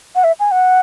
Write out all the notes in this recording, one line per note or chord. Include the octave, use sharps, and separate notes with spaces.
F#5
E5
G#5
F#5